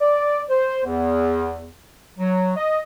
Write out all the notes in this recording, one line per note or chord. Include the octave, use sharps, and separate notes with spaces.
D5
C5
E2
F#3
D#5